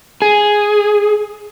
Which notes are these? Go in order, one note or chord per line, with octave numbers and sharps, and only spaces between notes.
G#4